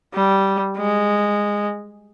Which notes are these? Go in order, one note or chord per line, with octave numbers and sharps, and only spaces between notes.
G3
G#3